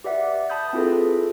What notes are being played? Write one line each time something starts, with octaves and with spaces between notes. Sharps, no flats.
G4 B4 D5 E5 F#5
A5 B5 D#6 G6
C4 E4 F4 G#4 A4 B4